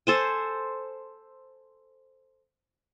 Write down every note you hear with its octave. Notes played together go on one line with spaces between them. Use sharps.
A4 C5 G#5